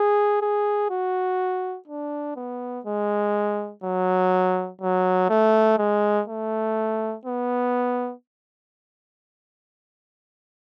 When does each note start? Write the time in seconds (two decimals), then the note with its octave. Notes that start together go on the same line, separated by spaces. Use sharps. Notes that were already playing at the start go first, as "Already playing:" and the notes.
Already playing: G#4
0.42 G#4
0.90 F#4
1.88 D4
2.36 B3
2.85 G#3
3.84 F#3
4.81 F#3
5.29 A3
5.78 G#3
6.28 A3
7.25 B3